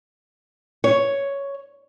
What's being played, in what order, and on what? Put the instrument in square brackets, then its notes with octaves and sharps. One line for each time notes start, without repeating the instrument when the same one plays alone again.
[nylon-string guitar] C#5